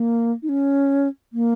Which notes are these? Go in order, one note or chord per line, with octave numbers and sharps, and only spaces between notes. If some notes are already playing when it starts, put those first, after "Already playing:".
Already playing: A#3
D#4
C#4
A#3